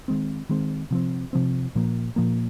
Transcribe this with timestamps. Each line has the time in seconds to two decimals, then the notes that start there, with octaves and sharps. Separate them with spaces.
0.08 D#3 G#3 C4
0.49 D#3 G#3 C4
0.91 C3 F3 C4
1.33 C3 F3 C4
1.75 A#2 F3 A#3
2.16 A#2 F3 A#3